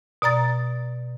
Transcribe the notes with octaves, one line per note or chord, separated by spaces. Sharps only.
B2 D5 A#5 A6